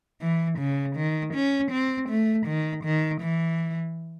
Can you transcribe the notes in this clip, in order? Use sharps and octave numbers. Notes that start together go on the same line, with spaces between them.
E3
C#3
D#3
C#4
C4
A3
D#3
D#3
E3